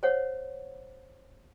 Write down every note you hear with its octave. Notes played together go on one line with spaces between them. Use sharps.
C5 C#5 F#5